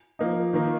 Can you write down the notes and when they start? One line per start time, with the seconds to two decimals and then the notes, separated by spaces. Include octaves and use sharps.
0.19 F3 A#3 D#4
0.53 D#3 A#3 D#4